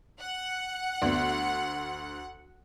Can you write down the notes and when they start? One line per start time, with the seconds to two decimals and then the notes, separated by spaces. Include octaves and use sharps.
0.20 F#5
1.02 D2 B3 D5